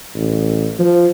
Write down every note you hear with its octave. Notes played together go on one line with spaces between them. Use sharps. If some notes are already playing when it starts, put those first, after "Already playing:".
A1
F3